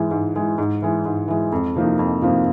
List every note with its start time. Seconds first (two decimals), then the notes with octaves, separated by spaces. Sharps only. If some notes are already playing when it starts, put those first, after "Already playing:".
Already playing: G#2 E3 G#3
0.11 G#2
0.35 E3 G#3
0.58 G#2
0.82 E3 G#3
1.05 G#2
1.28 E3 G#3
1.52 F2
1.75 C3 F3 A#3 D#4
1.99 F2
2.22 C3 F3 A#3 D#4